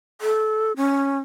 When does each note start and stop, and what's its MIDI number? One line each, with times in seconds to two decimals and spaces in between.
0.21 0.72 69
0.76 1.19 61